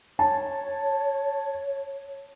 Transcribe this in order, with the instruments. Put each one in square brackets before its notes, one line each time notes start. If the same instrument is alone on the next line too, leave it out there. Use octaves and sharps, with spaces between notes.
[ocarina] C#5 [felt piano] A5